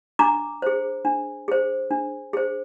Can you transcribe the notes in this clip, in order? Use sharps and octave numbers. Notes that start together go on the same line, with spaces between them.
D4 A#5 D6
G#4 C5
D4
G#4 C5
D4
G#4 C5